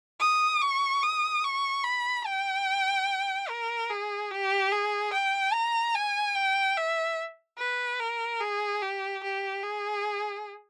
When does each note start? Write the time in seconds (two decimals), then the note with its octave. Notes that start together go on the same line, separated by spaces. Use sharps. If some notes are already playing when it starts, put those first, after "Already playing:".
0.21 D#6
0.61 C#6
1.03 D#6
1.44 C#6
1.84 B5
2.26 G5
3.49 A#4
3.90 G#4
4.31 G4
4.72 G#4
5.13 G5
5.53 A#5
5.95 G#5
6.36 G5
6.77 E5
7.59 B4
8.00 A#4
8.41 G#4
8.82 G4
9.23 G4
9.64 G#4